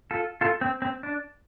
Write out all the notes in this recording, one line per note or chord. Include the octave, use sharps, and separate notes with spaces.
F4 A4
F4 A4
C4
C4
D4